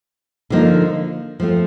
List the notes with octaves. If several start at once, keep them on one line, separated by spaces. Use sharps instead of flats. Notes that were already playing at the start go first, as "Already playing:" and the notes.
D3 F3 A#3 D#4
F3 A3 C4